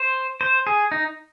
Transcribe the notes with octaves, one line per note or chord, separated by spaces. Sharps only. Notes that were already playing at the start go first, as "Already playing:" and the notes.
Already playing: C5
C5
G#4
D#4